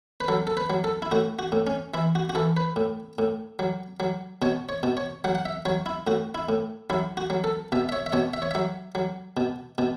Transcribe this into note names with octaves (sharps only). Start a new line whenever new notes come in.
B4
F#3 A4
A4
B4
F#3
A4
E4
A2 F#4
F#4
A2
C#4
E3 E4
F#4
F#4
E3 A4
B4
A2
A2
F#3
F#3
B2 C#5
C#5
B2
C#5
F#3 F#5
F#5
E5
F#3 C#5
E4
A2 F#4
E4
A2
F#3 E4
F#4
F#3
A4
B2 E5
E5
C#5
E5
B2 C#5
E5
C#5
F#3 E5
F#3
B2
B2